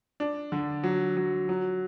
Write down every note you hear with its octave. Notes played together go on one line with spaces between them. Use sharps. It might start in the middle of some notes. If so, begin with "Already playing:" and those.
D4
D3
F#3
F#3
F#3